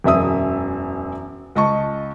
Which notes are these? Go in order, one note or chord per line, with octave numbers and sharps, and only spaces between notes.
E1 F#2 E5 D#6
C#2 D#5 A5 C#6